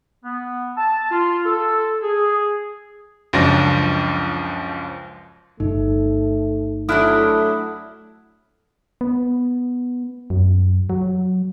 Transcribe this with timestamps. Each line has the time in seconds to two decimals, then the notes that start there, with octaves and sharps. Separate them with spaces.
0.24 B3
0.77 A5
1.11 F4
1.45 A4
2.03 G#4
3.33 C#2 F#2 F3 D4 A#6
5.60 G1 A3 D#4
6.89 F#3 A3 D4 E4 D#6 F6 F#6
9.01 B3
10.30 F#2
10.90 F#3